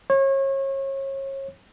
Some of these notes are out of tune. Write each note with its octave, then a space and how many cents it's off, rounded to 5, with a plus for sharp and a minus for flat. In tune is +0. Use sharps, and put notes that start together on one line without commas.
C#5 -30